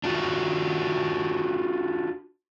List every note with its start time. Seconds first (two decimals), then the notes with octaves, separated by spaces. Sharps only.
0.04 D4 F4 F#4